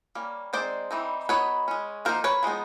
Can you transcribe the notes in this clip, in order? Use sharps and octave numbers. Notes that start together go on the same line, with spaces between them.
G3 A#3 C#4
G#3 C4 D#4 C5 D5
E3 G3 C4 D#4
F#3 B3 D#4 B4 C#5
G#3 C#4
F3 A#3 D#4 A#4 C5
B4 C#5
F3 G#3 B3 D#4